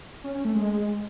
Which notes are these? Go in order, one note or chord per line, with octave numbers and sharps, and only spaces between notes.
C#4
C#4
A3
G#3